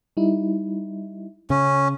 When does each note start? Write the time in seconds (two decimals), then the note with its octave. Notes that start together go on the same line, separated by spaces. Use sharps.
0.17 G3 D#4 E4
1.50 C#3 C#4